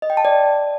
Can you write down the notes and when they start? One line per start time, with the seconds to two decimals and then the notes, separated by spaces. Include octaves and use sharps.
0.02 D#5
0.10 G5
0.17 A5
0.25 D5